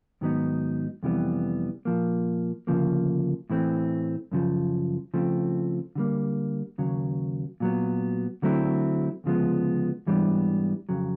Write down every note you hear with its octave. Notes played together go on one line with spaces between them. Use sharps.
G#2 D#3 F#3 B3 D#4
F2 C3 E3 G3 B3
A#2 F3 A#3
D2 C#3 F3 A#3
A2 E3 A3 C4
F#2 C#3 F3
C#3 F3 A3 C4
D3 G3 A#3
D#2 C#3 F#3
A#2 F#3 B3
D3 F#3 A3 C4 E4
D2 C#3 F3 G#3 B3
G#2 E3 G3 B3 D4
F2 C#3 F#3